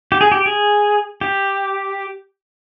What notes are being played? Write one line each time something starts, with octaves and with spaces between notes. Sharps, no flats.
G4
G#4
G4
G#4
G4